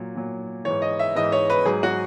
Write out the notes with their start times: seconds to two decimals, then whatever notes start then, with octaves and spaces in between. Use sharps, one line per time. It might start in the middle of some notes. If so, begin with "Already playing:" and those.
Already playing: A#2 F#3
0.16 A#2 F#3
0.65 G#2 E3 C#5
0.82 D#5
0.99 E5
1.15 G#2 E3 D#5
1.32 C#5
1.50 B4
1.65 G#2 F#3 G#4
1.83 F#4